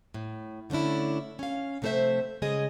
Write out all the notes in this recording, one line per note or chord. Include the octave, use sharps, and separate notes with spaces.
A2
D3 A3 C#4 D4 E4
C#4 F5
C3 F3 A3 A4 C5 E5
C#3 G#3 G#4 D#5